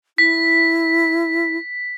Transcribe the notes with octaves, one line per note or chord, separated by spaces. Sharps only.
E4 B6